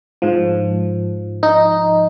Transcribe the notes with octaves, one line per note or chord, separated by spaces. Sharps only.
G#2 F3
D#4